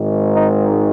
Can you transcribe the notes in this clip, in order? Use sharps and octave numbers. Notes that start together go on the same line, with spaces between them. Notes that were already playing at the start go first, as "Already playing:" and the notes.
Already playing: G#1 G#2 D#3
D#4